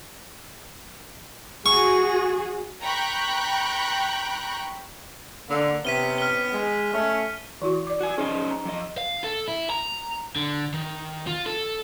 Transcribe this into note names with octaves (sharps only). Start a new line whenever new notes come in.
F#4 G#4 C#6
G5 A#5 B5 C#6 F#6 G6
D3 A#3
C3 D#3 B3 C#4 B6 D#7 G7
F6 G7
G#3
A3 C#4
E3 E4 F#4
D5 D6
F#4 G#5
C#4 D#4 G#4 C5 D#5
A#5
F2 D#5
F5
A4
E4
A#5
D3
D#3
F4
A4